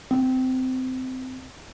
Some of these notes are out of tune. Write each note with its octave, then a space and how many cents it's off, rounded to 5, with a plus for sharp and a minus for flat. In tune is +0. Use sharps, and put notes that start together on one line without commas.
C4 -20